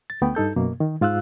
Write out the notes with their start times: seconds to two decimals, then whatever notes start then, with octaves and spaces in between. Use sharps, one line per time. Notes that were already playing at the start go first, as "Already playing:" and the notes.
0.10 A6
0.21 D2 A3 B3 G5
0.35 G2 D#4 A4 G6
0.56 F#2 B2 A#3
0.80 D#3
1.01 G#2 F4 F5 E6 F#6